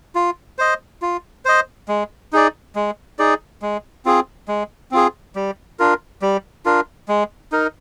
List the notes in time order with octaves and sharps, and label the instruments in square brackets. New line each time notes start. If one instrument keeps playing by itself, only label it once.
[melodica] F4
C5 D#5
F4
C5 D#5
G#3
D#4 G#4 D5
G#3
D#4 G#4 D5
G#3
C4 F4 G#4
G#3
C4 F4 G#4
G3
D4 F4 A#4
G3
D4 F4 A#4
G#3
D#4 A#4